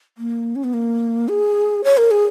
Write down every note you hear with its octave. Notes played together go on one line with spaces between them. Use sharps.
A#3
C#4
B3
A#3
G#4
C#5
A#4
G#4